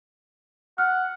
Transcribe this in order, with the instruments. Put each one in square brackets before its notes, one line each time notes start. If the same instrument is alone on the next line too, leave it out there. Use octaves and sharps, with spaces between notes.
[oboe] F#5 [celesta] F6